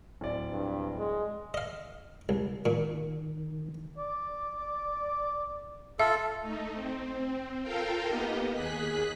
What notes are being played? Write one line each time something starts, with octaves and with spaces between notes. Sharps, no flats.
D1 D5
G2
G#3
D#5 F5
C2
A#2 D#3
D5
F4 A4 E5
A3 D#4
C4
F4 A4 A#4 F5 G5
A#3 B3 D#4 G4 D#5
D#2 G#4 F#6 B6